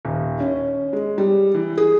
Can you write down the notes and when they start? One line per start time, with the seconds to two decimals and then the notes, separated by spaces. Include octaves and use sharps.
0.05 D#1
0.40 C#4
0.93 G#3
1.18 G3
1.54 E3
1.77 G#4